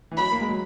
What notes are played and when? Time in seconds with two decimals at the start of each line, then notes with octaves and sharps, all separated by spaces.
0.11 E3
0.17 F#3 B5
0.32 A#3
0.41 G#3
0.49 F#3